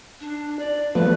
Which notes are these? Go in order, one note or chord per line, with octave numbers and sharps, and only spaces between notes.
D4
D5
F3 A3 B3 B4